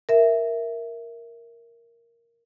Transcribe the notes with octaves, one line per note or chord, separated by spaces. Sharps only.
A#4 E5